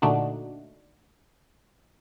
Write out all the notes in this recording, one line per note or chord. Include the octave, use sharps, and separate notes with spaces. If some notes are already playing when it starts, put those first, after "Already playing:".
A#2 D3 A3 D4 D#4 F#4